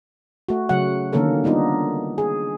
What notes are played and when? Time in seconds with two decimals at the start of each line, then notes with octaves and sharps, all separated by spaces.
0.49 A3 F#4
0.69 C#3 F#3 F#4 F#5
1.13 D3 D#3 A#3 C#4 A4 A#4
1.44 G3 B3 D4 D#4 F4
2.18 G#4